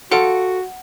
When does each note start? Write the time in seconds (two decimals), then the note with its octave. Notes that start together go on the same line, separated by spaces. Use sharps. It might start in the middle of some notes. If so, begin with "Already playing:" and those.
0.12 F#4 A4 F5 F#5 C6 D7